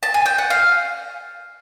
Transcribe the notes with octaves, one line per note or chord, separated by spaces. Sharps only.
A5
G#5
G5
F#5
F5